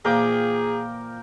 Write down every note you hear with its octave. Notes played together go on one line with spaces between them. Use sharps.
A#2 E3 F3 G#4 A#4 G5 D6